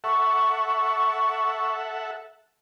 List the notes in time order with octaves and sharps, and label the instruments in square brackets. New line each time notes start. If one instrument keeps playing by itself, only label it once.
[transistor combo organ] A4 E5 F#5 [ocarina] C#6